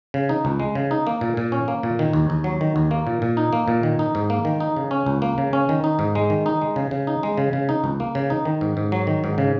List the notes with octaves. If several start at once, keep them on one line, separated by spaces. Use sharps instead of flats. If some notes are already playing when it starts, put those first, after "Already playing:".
C#3
D#4
C#2
G#3
C#3
D#4
A#3
A#2
A#2
C#4
A#3
A#2
D#3
D#2
D#2
F#3
D#3
D#2
A#3
A#2
A#2
D#4
A#3
A#2
D#3
D#4
G#2
A#3
D#3
D#4
C#3
C#4
C#2
A#3
C#3
C#4
D#3
D#4
G#2
G#3
D#3
D#4
G#3
C#3
C#3
D#4
G#3
C#3
C#3
D#4
C#2
A#3
C#3
D#4
D#3
G#2
G#2
F#3
D#3
G#2
C#3